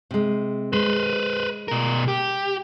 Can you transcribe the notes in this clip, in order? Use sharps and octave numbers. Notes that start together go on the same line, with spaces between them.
C3 G#3
G#3 B4 C5
B2 A#4
G4